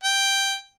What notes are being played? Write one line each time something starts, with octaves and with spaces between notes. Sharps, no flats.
G5